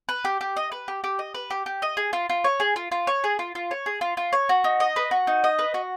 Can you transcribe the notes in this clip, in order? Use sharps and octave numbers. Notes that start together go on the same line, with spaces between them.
B4
G4
G4
D#5
B4
G4
G4
D#5
B4
G4
G4
D#5
G#4
F4
F4
C#5
G#4
F4
F4
C#5
G#4
F4
F4
C#5
G#4
F4
F4
C#5
F#4
D#4
D#5
B4
F#4
D#4
D#5
B4
F#4